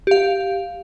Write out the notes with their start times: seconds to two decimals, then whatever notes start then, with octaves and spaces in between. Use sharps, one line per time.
0.07 G4 F5